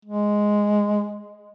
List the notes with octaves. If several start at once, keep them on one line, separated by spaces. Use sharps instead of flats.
G#3